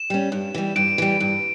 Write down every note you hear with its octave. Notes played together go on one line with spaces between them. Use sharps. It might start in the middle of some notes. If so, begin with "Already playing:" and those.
Already playing: E7
G3 C#4
G2
E3 G3
G2 D7
E3 G3
G2